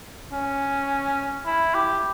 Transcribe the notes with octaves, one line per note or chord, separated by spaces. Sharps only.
C#4
E4
G4